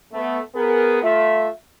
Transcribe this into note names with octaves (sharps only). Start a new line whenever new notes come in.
A3 B3
B3 G#4 A#4
A3 F4 E5